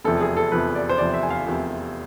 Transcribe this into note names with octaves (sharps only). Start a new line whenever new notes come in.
F1 E2 C3 F3 A4
G#4
A4
F1 E2 C3 F3 B4
D5
C5
F1 E2 C3 F3 D5
D5
E5
G#5
F5
F1 E2 C3 F3